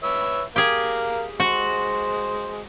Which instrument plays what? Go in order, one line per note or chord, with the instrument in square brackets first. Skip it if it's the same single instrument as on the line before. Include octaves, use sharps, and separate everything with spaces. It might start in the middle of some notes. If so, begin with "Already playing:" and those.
[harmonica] B4 C#5 E5
[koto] G4 G#4 [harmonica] A#4 F5
[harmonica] G#3 C5 [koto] F#4